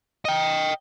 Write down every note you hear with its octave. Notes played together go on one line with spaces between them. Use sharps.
D#5 G5